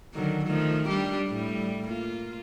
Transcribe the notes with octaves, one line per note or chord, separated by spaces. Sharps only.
D3 D#3 F#3
D#3 F3 A3
G3 D4 G4
A2 G3
A#3 F4